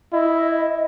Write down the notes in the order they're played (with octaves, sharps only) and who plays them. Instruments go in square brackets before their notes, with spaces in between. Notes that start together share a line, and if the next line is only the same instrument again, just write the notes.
[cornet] E4 [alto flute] D#5